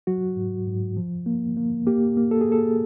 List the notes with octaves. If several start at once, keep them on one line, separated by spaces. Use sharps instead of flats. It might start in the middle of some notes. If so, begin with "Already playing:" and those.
F#3 F#4
G#2
G#2
F3
A#3
A#3
A#3 G4
A#3
A4
G#4
A#3 A4